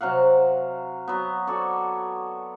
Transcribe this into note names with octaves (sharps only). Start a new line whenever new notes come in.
C3 F#3 F5 F#5
F#3 B3
F#4 A4 C#5 D5